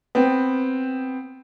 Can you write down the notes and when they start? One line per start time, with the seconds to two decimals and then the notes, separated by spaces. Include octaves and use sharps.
0.15 B3 C4